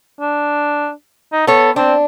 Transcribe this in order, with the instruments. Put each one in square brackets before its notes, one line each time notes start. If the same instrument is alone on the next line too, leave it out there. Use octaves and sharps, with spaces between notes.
[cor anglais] D4
D#4
[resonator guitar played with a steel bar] B3 C#5 [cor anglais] A4
[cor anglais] C4 [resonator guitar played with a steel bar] D4